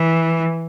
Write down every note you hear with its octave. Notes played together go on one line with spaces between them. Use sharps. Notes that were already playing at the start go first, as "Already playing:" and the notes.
Already playing: E3